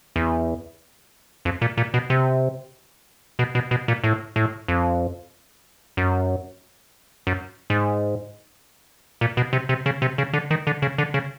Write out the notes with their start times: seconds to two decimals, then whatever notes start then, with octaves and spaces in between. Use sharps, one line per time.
0.16 E2
1.45 F2
1.62 A#2
1.77 A#2
1.94 B2
2.10 C3
3.39 B2
3.55 B2
3.71 B2
3.88 A#2
4.04 A2
4.36 A2
4.68 F2
5.97 F#2
7.27 F#2
7.70 G#2
9.21 A#2
9.37 B2
9.53 C3
9.69 C3
9.86 C#3
10.02 C3
10.18 C#3
10.33 D3
10.51 D#3
10.67 D3
10.82 C#3
10.98 D3
11.14 C#3